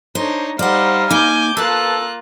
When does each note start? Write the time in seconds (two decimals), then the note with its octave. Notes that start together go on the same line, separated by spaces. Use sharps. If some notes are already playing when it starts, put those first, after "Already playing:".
0.15 D4 D#4 C5 C#5
0.59 G3 D#4 C5 D5 F5 F#5
1.11 A#3 D#4 G#5 D6 G6
1.57 A#3 F4 A4 B4 A5 F#6